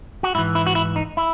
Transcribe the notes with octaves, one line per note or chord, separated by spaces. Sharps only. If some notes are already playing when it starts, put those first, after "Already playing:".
F#4
G#2 E3 E4
E4
F#4
E4
D#4
E4